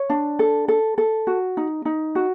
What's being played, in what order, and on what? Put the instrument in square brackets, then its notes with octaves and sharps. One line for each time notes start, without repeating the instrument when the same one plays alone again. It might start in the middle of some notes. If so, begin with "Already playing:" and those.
Already playing: [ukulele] C#5
D4
A4
A4
A4
F#4
D#4
D#4
F#4